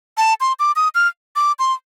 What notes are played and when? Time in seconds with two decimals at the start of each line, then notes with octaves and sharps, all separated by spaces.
0.17 A5
0.41 C6
0.59 D6
0.76 D#6
0.95 F6
1.36 D6
1.59 C6